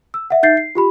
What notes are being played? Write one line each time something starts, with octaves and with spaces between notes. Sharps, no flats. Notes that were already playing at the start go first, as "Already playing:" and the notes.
E6
E5 F#5
D#4 E5 G6 A6 C7
C7
F4 G4 B5